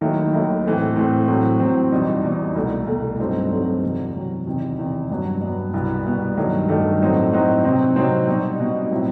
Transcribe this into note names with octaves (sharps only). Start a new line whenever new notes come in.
D#2 D#3 F#3 A3 E4
D#2 D#3 F#3 A3 E4
A2 E3 A3 C4
A2 E3 A3 C4
A2 F#3 C4
A2 F#3 C4
E2 B2 G3 D#4
E2 B2 G3 D#4
C2 B2 A3
C2 B2 A3
G2 F#3 A3 C4 D#4
G2 F#3 A3 C4 D#4
E2 C3 F#3
E2 C3 F#3
E2 C3 D#3
E2 C3 D#3
G2 F#3 B3
G2 F#3 B3
C2 B2 G3 B3
C2 B2 G3 B3
G2 D#3 F#3 A3
G2 D#3 F#3 A3
A2 F#3 C4 D#4
A2 F#3 C4 D#4
C3 F#3 C4 D#4
C3 F#3 C4 D#4
B2 G3 D#4
B2 G3 D#4
A2 F#3 C4 E4